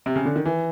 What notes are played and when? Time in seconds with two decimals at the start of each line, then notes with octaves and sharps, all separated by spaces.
0.06 C3
0.16 C#3
0.25 D3
0.36 D#3
0.45 E3